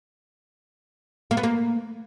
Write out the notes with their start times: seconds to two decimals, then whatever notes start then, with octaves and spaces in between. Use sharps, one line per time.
1.31 A#3
1.37 B3
1.43 A#3